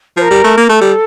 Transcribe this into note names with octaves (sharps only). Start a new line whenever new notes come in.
F3 A#4 C5
G3
A3
A#3
A3 A4
G3